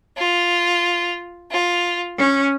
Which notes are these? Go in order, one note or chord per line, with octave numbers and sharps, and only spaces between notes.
F4
F4
C#4